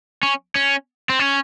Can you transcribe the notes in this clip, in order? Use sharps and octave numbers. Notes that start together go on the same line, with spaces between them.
C#4
C#4
C4
C#4